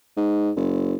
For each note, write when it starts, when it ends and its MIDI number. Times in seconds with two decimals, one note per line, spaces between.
0.17 0.51 44
0.56 0.95 30